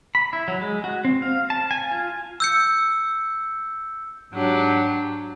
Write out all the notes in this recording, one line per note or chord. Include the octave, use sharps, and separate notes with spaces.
B5
E4
F#3
G#3
F#4
C4
F5
A5
G#5
F4
E6 G6 C#7
G#2 F#3 D4 G4